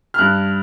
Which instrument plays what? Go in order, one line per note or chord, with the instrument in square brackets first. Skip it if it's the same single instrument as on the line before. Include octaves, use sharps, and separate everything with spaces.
[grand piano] F6
G2 F#6